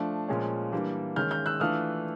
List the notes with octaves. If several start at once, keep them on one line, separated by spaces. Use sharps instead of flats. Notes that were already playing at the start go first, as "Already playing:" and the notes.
Already playing: F3 A3 D4
A#2 F3 G#3 C#4
E3 G3 A#3 D4
D#3 G#3 C#4 F6 G6
F6 G6
E6 F#6
E3 A3 D4 F4 D#6 F6